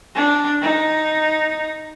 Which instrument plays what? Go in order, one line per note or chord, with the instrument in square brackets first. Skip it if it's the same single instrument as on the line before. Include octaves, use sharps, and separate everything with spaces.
[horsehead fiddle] D4
D#4